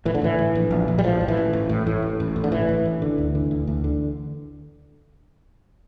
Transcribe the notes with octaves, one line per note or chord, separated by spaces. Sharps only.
A2 E3
D3
A2 E3
A2
A#1
A#1
A#1
G3
A2 F3
A2
E3
A1
A1
A2
A2
A1
A1
A2
D3
A1 E3
A2
A1
D3
D2
D3
D2
D2
D3